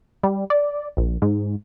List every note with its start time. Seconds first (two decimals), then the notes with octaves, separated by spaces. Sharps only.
0.23 G3
0.50 D5
0.97 A#1
1.22 G#2